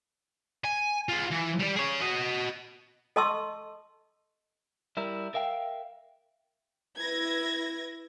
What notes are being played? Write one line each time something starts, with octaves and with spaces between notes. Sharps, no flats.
G#5
F4 G#4
E3
G3 D5
G#4 C#5
F#4 D#5
A4 D#5 A5 C6 C#6 E6
G3 E4 A#4
A#4 E5 F5 G5
E4 B4 G#6 A#6